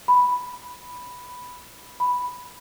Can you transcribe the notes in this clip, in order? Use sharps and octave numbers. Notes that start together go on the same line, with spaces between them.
B5
B5